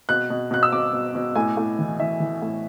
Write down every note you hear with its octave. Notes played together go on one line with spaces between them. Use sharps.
B2 F#6
B2
B2 F#6
E6
B2 D6
B2
B2
A2 G#5
A2
E3
E3 E5
E3
A2